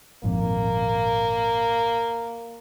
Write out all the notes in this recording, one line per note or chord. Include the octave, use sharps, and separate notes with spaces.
G#1 F2 A#2 A#3